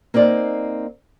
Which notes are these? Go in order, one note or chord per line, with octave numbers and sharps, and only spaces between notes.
A#3 C4 D#4 D5